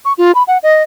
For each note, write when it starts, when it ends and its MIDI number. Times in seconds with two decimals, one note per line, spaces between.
0.05 0.13 85
0.18 0.32 65
0.35 0.43 83
0.47 0.58 78
0.63 0.83 75